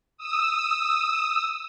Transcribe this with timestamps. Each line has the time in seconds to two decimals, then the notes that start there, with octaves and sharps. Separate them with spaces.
0.17 D#6 E6